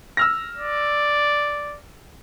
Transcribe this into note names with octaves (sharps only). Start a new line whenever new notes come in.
E6 F6 A#6
D5